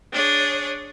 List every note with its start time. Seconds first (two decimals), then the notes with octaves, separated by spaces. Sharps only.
0.13 D4 G#4 C#5